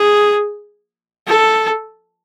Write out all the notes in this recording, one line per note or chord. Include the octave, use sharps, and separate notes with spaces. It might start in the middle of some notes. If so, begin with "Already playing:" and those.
Already playing: G#4
A4